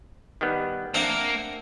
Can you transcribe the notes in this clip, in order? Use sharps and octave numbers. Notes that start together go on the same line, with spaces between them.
D#3 G3 B3
A#3 C4 D4 E5 F#5